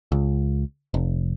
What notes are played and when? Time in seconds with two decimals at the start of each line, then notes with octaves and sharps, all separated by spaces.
0.12 C#2
0.94 F1